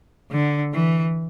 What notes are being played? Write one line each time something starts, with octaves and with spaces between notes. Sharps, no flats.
D3
E3